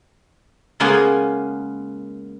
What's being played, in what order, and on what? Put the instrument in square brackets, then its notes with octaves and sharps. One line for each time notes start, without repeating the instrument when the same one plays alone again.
[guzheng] C#3 G#3 A#3 B3 G#5